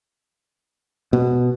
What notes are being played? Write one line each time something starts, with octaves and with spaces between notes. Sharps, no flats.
B2